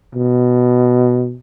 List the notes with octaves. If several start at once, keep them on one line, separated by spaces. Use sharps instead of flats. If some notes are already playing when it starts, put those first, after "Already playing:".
B2